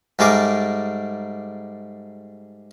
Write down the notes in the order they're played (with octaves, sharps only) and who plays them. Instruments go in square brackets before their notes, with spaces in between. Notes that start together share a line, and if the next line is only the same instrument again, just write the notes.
[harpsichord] G#2 G3 A3 G#4 A#4 D6